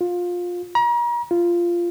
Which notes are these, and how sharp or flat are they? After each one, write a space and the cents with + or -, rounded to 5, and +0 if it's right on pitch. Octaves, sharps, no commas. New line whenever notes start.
F4 +20
A#5 +40
F4 -10